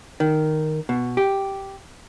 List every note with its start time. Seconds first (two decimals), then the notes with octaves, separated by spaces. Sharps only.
0.20 D#3
0.89 B2
1.17 G4